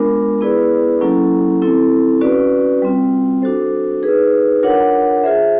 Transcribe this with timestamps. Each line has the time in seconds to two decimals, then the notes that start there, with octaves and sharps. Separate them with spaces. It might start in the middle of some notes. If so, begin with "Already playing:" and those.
Already playing: G#3 B3 D4 F4 A#4
0.41 B3 E4 G#4 B4 D5
1.01 F#3 A#3 C#4 E4 A4
1.62 C4 E4 A4
2.21 C#4 F#4 B4 D5
2.82 G3 C4 F4
3.42 D4 F#4 A4 C5
4.03 D#4 G#4 B4
4.63 D4 F4 A#4 C#5 F#5
5.24 F4 G#4 C5 E5